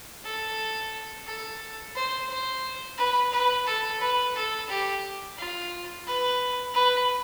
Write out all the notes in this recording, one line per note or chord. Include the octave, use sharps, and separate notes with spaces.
A4
A4
C5
C5
B4
B4
A4
B4
A4
G4
F4
B4
B4